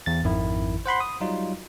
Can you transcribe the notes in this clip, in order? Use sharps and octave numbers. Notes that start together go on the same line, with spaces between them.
E2 A6
G#1 F2 D#3 E4
C5 F#5 B5 C6
D#6
F#3 G3 D#4 F4